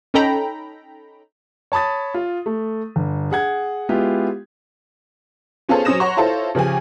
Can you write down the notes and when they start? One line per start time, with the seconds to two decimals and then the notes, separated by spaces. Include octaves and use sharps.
0.14 C#4 D#4 A4 G5 A#5 B5
1.72 C#5 A5 B5 D#6 A6
2.14 F4
2.46 A3
2.96 G1
3.31 G#4 F#5 G#6
3.89 G#3 B3 E4 F4 G4
5.69 B3 C#4 F4 G#4 A4 C5
5.85 F#3 C#4 C5 D#6 A#6 E7
6.00 C#5 F#5 A#5 C6 C#6
6.17 E4 F4 A4 C5 C#5
6.55 C#3 F3 G4 G#5